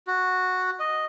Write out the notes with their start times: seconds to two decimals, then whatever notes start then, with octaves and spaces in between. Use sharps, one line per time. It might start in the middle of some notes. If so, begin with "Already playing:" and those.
0.07 F#4
0.80 D#5